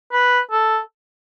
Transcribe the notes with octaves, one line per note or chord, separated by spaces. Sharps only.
B4
A4